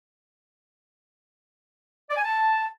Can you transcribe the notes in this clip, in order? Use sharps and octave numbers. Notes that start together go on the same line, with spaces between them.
D5
G#5
A5